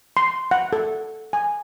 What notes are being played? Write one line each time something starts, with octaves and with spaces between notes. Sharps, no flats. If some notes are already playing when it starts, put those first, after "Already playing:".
C6
F#5
A4
G#5